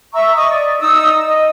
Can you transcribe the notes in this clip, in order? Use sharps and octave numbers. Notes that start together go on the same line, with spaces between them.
E5 A#5 C#6 E6
D#5 C#6 D#6
D5
D#4 D#6 E6
D#5